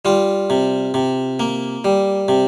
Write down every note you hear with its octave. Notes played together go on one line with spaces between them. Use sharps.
G3 F4
C3
C3
A#3
G3
C3